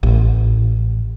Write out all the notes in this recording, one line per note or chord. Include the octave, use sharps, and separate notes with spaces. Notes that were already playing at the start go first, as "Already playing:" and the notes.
A1